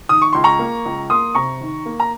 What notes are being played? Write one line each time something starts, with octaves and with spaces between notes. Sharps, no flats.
D#3 D#6
C#6
C#2 C6
A#5 C#6
A#3
C#2
A#3 C6 D#6
C3 A#5 C#6
D#3
A#3
A#5